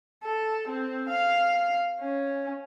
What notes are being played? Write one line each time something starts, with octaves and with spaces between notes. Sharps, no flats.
A4
C4
F5
C#4